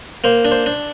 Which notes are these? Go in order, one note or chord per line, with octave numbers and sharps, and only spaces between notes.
A#3 C5
D4
C5
D4